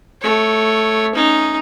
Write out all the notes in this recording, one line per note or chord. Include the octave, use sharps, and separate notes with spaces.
A3 C#5
C#4 D#4